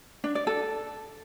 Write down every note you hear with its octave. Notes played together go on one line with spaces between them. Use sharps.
D4
D5
A4